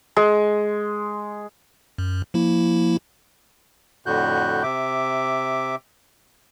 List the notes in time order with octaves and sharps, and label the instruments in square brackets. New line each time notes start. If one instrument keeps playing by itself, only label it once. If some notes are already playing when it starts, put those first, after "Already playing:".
[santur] G#3
[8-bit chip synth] F#2
F3 A#3 E4
[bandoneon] F2 A2 D3 F#4 F#6 G6
C3 E5 D6